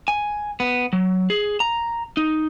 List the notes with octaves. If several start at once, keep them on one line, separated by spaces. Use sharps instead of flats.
G#5
B3
F#3
G#4
A#5
D#4